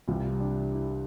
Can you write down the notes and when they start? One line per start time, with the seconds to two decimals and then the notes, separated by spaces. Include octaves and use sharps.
0.08 C2 C3 E3 G3 F4
0.40 D4
0.74 E4